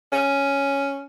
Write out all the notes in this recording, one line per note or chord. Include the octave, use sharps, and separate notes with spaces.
C#4